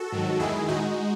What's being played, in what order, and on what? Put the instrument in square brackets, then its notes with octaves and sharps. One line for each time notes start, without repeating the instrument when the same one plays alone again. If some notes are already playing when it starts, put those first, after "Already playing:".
Already playing: [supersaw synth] F#4 A4
G#2 D#3 F#3
E2 D#3 G#3 E4 G#4
A2 G#3 D#4 F#4